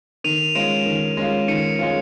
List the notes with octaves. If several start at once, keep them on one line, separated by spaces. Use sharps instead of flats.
D#3 D#7 F7
D#7
G#3 C#4 F4 D7 E7
D#3
G#3 C#4 F4
D#3 C#7 D#7
G#3 C#4 F4